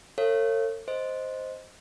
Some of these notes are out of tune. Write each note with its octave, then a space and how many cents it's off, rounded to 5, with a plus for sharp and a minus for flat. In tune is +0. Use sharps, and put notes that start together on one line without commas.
A4 +45 C#5 -30 F5 -40
C5 +0 D#5 +0